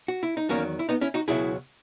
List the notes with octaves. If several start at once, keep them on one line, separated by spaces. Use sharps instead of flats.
F#4
E4
D#4
E2 D#3 F#3 A#3 C#4
E4
B3 D#4
C#4 E4
D#4 F#4
C#2 B2 F#3 E4 G#4